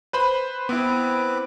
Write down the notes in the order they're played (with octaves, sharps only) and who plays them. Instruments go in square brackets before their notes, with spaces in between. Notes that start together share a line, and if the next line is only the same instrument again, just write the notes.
[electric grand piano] B4 C5 B5
[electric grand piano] B3 E4 [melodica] C4 B4 D6